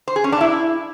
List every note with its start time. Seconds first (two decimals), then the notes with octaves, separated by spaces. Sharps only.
0.08 C5
0.16 G#4
0.24 C#4
0.32 D4
0.41 E4